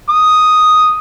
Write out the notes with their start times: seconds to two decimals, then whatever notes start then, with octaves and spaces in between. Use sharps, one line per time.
0.09 D#6